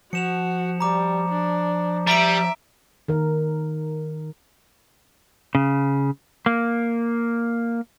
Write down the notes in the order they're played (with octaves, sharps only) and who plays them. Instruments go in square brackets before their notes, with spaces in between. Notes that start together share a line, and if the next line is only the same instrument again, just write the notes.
[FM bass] F3 [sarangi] F#4 [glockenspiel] C#7 E7 F7
[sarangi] G3 [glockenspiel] A#5 D6
[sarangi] D4
[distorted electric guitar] G3 [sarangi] E5 [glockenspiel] A#5 B6 D7
[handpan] D#3 A#4
[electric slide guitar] C#3
A#3